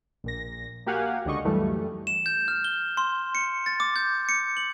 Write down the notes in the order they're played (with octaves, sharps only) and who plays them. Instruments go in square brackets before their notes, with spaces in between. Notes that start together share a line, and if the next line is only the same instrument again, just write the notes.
[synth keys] A#1 A#2 A#6
A#3 F#4 G4 F5 F#5 G#5
C#2 D3 D4 D#5 C#6
F#2 E3 G3 A3
[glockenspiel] E7
G6
F6
G7
C6
C#7
A6
D6
G6
C#7
F#7